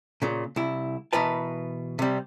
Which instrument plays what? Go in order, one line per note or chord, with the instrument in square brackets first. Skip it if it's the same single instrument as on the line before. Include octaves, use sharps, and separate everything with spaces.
[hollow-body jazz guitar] A#2 C#3
C2 E4
B2 E3 A#4 B4 A5
C3 G3